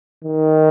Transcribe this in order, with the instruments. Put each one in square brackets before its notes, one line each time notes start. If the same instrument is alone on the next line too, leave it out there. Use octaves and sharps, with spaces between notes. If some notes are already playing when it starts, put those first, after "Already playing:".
[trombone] D#3